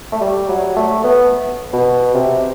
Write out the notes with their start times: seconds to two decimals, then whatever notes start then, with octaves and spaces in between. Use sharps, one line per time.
0.12 A3
0.21 G3
0.49 F#3
0.76 A3
1.04 B3
1.73 B2
2.14 C3